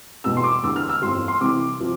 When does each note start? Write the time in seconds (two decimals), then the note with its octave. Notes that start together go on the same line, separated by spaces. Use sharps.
0.24 E2 B2 G3 E6
0.37 C6
0.44 D6
0.63 E2 D3 G3 E6
0.76 F6
0.89 E6
1.02 G1 F2 E3 G3 C6
1.28 C6
1.41 C2 C3 E3 G3 D6
1.80 C3 F3